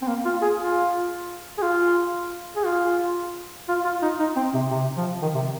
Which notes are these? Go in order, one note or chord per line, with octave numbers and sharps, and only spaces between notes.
C4
A#3
F4
G#4
F4
G#4
F4
G#4
F4
F4
F4
D#4
D#4
C4
C3
C3
F3
D#3
C3